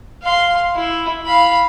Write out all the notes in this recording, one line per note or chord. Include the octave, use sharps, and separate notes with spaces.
F5 C6
E4
F5 B5